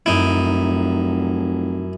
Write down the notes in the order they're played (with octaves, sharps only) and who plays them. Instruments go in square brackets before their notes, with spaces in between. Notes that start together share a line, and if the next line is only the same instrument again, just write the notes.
[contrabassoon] F1 [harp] F#2 D7 [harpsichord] D#4 E4